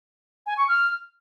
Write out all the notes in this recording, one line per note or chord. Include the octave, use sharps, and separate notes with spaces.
G#5
C#6
F6